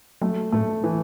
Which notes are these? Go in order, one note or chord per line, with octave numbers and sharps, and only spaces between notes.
F#3 A3
A2 A3
E3